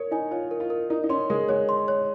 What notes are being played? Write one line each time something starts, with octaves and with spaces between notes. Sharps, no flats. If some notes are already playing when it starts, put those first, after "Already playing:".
Already playing: A#4 C#5
D#4 G#5
F4 C#5
A#4
F4
A#4
D#4 A#4
D#4
C#4 C6
G#3 A#4
G#3 C#5
C6
C#5